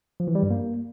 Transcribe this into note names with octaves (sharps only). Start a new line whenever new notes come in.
F3
E3
G3
G2
A#3